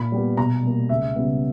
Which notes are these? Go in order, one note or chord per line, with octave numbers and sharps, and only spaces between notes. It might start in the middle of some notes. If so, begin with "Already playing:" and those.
Already playing: A#2 B5
G3 B3
B2 A#5
G3 A#3
C#2 E5
C#3 G3 B3